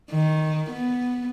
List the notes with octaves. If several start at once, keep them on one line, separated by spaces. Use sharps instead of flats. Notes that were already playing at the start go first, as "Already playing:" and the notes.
D#3
B3